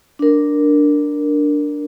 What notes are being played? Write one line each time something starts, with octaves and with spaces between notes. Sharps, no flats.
D4 A#4